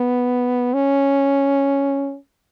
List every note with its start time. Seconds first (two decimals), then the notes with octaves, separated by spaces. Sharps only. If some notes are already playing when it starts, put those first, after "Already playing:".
Already playing: B3
0.74 C#4